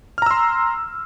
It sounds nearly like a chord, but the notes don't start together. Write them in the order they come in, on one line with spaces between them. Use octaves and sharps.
F6 A#5 E6 C6